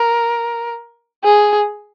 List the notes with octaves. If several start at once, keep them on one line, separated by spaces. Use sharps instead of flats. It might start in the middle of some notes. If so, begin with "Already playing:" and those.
Already playing: A#4
G#4